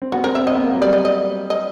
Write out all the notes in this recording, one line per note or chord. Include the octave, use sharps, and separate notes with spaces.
C4
B3 F#4
C4 A#4
C4 E5
C4 D#5
B3
A#3
F#3
G3 D5
D#5
D#5
D#5